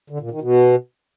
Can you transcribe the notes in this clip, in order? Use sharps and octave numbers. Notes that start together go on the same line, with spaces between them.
D3
A#2
D#3
B2